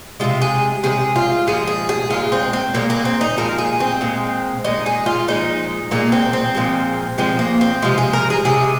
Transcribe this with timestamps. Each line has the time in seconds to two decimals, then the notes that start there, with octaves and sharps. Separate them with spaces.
0.20 C3 F3 G#3 F4
0.42 G#4
0.83 C3 F3 G#4
0.88 G#3
1.16 F4
1.47 A#2 F3 G#3 G#4
1.67 G#4
1.89 G#4
2.10 A#2 F3 G#3 F4
2.32 C4
2.53 C4
2.74 A#2 F3 G#3 A#3
2.90 A#3
3.05 C4
3.21 D#4
3.37 A#2 F3 G#3 A#4
3.58 G#4
3.80 C4
4.01 A#2 G#3
4.64 A#2 G#3 D#4
4.86 G#4
5.06 F4
5.28 A#2 F3 G#3 D#4
5.91 A#2 F3 G#3 A#3
6.12 C4
6.33 C4
6.55 A#2 F3 G#3
7.18 A#2 F3 G#3 C4
7.39 A#3
7.61 C4
7.82 C3 F3 G#3 F4
7.98 G#4
8.13 A#4
8.30 G#4
8.45 C3 F3 G#3 G#4